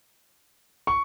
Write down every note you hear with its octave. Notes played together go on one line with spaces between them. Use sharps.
C#6